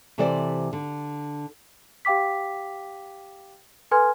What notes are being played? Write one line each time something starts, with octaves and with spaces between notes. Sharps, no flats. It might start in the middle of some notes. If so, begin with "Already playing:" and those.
C3 E3 G4 A4 C5 D5
D3
G4 F5 G5 D6 B6
A4 B4 G#5 C6 F6 G#6